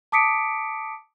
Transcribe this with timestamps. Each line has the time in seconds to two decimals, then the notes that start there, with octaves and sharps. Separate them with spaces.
0.12 A5 D6 D#6 B6 C#7 D7